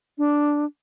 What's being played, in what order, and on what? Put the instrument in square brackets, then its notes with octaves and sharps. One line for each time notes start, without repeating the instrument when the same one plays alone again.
[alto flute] D4